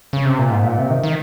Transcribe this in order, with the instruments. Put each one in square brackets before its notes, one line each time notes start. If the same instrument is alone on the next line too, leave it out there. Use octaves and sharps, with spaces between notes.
[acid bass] C#3
C3
A#2
G#2
A#2
C3
D#3
D#3